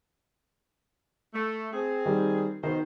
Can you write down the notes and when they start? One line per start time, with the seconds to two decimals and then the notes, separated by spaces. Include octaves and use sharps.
1.34 A3
1.73 C4 G#4
2.06 D#3 G3
2.63 B2 D#3 C5